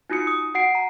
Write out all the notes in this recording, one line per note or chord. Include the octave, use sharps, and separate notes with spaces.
D#4 F4 F#4 D#6 C#7
D#6
F#4 F#5 C7 D7
A#5